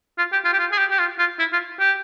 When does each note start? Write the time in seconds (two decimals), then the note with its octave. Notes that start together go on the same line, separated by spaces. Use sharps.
0.18 F4
0.32 G4
0.44 F4
0.53 G4
0.59 F4
0.72 G#4
0.78 G4
0.91 G4
0.99 F4
1.19 F4
1.39 E4
1.52 F4
1.79 G4